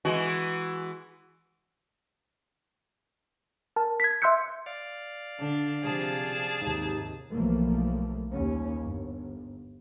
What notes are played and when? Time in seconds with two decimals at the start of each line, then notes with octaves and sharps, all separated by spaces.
0.05 E3 G#3 F#4
3.76 A#4 A5
4.00 G#6 B6
4.22 E5 C6 E6 F#6 G6 C#7
4.66 D5 F5
5.39 D3 D4
5.83 C3 F3 G#4 A5
6.61 D#2 G#2 C3 D#4
7.32 B1 E3 F3 G3 A3 A#3
8.32 D#2 G3 A#3 C#4
8.82 G1